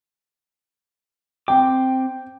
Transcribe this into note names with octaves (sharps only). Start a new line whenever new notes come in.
C4 G5 D6